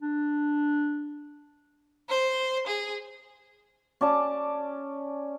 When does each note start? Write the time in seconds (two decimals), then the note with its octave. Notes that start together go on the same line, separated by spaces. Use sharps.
0.02 D4
2.09 C5
2.66 G#4
4.01 C#4 D5 A5